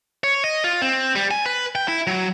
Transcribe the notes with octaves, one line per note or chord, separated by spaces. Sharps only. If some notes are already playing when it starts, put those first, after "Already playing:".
C#5
D#5
F4
C4
G3
G#5
B4
G5
E4
F#3